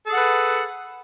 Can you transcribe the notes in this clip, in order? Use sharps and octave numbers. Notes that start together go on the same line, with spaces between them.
G#4 A4 B4 F#5